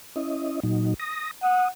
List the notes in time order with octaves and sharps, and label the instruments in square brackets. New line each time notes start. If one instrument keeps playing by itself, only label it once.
[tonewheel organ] C#4 E4 D#5
A#2 F#3 D#4
D#6 A#6
[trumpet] F#5 [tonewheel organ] D#6